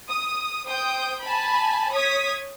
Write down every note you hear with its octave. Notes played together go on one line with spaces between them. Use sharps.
D#6
C5 G5 D#6 G6
G#5 A5 B5
C#5 D#6 G#6 B6